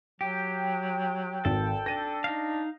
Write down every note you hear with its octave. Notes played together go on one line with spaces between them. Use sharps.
F#3 G4 G5
G#1 A4
D4 A#6 D#7
D#4 F5